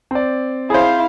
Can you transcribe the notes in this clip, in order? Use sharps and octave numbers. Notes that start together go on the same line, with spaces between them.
C4 D5
E4 G#4 C5 F5